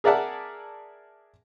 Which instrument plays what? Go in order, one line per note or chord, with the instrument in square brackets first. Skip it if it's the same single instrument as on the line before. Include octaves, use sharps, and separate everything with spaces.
[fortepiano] G#4 A#4 D5 E5 F#5 A5